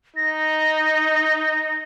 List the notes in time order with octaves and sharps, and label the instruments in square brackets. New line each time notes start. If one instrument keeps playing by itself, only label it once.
[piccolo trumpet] D#4 [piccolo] A#6